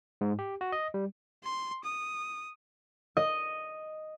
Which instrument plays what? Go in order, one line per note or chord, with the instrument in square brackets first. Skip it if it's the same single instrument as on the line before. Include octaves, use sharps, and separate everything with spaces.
[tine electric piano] G#2
G4
F#4
D#5
G3
[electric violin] C6
D#6
[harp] D#5